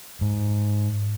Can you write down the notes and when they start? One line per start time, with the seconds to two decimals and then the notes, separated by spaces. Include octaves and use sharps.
0.21 G#2